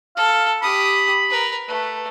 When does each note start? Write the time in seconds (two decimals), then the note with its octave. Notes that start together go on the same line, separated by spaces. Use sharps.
0.16 A4 F5
0.63 G4 B5 D#6
1.30 A#4 B4
1.68 A3 B4